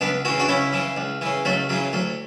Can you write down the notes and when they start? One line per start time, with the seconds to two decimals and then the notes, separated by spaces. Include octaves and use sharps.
0.01 C#2 B3 D4
0.25 C#3 E3 F#4
0.39 D4 F#4
0.48 C#2 C#4 E4
0.73 C#3 E3
0.97 C#2
1.21 C#3 E3
1.45 C#2 F#3 A3
1.69 C#3 E3 F#3
1.93 D2 F#3